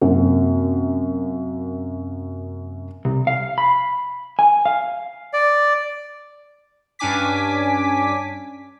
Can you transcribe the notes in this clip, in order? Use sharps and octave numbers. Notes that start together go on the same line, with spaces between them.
F#2 C3 A#3
C2
F5
B5
G#5
F5
D5
G2 C#4 D4 G#5 D6 B6